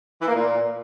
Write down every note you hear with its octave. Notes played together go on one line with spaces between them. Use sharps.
E3
A#3
A#2